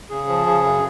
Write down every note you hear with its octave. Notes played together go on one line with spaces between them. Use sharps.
C#3 G#4
F3
C#3
F#2